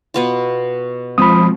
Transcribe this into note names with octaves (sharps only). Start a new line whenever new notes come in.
B2 B3 F4
F3 G#3 C4 B5 D#6